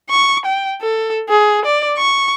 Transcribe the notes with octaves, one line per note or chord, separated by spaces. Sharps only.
C#6
G5
A4
G#4
D5
C#6